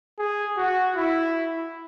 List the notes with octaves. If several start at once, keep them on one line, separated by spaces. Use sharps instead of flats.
G#4
F#4
E4